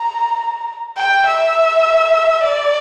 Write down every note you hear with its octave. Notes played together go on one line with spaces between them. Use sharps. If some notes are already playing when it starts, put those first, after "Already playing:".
Already playing: A#5
G5
E5
D5